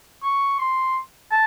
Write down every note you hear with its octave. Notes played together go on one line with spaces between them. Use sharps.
C#6
C6
A5